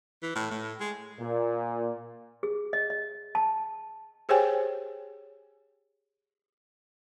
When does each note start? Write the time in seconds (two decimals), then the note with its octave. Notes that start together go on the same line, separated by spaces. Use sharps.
0.22 E3
0.36 A2
0.51 A2
0.80 G#3
1.19 A#2
2.43 G#4
2.73 D#5
2.90 D#5
3.35 A5
4.29 G4 G#4 C5 C#5 G5 G#5